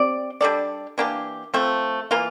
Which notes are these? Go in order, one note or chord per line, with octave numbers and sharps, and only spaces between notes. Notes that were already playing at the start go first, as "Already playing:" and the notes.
Already playing: C4 G4 D5
G3 D4 A4 D5
E3 A#3 D4 G4
F3 A3 C4
E3 A#3 F4